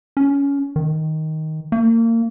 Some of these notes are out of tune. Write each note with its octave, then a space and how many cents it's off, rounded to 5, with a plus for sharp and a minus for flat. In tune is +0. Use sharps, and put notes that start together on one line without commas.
C#4 +20
D#3 +10
A#3 -30